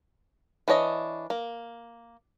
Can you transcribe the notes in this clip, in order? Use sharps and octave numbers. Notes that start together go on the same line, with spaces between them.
E3 D4 C#5 D#5
A#3